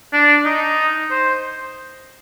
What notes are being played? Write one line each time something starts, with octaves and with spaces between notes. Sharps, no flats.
D4
D#4
C5